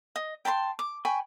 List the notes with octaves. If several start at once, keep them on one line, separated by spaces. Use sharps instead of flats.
D#5
G5 A5 B5 C6
D6
G5 G#5 B5 C#6